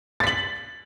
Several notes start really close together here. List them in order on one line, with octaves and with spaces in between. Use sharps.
A6 B6 F#7